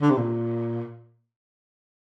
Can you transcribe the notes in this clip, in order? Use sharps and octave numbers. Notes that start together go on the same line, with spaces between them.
D3
C3
A#2